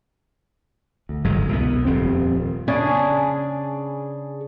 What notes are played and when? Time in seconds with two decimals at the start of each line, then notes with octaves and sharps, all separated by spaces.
1.09 D2
1.25 G1 G#2 F#3 G#3
1.49 C2 B2 B3
1.85 D#1 F2 C4
2.68 C#3 D4 G#4 G#5